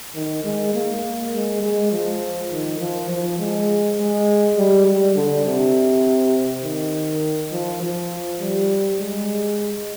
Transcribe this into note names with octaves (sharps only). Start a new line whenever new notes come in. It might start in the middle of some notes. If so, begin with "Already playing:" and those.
D#3
G#3
A#3
G#3
G#3
F3
D#3
F3
F3
G#3
G#3
G3
G3
D3
C3
D#3
F3
F3
G3
G#3